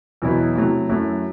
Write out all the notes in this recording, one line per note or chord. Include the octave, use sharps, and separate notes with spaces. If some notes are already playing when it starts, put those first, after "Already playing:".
E2 B2 F#3 B3 E4
C3 F#3 A3 E4
F#2 F#3 A3 E4